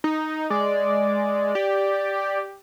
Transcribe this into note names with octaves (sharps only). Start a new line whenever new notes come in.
D#4
G#3 D5
G4